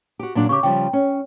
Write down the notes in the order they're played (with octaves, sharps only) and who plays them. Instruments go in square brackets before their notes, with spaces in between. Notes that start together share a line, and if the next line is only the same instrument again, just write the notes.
[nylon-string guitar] F#4 G4
A#2 F#3 D4
[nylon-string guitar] C#3 G4 [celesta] C#6 D6
[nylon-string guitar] C#3 F3 G3 [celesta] G5
[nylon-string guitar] C#4